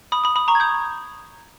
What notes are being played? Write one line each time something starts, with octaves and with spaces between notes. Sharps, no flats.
B5 D#6
B5 D#6
B5 D#6
A#5 C#6
G#6
D#6 G6